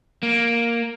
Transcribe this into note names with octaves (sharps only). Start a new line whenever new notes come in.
A#3